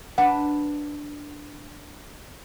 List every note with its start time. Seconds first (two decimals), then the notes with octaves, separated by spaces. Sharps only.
0.18 D4 B4 F#5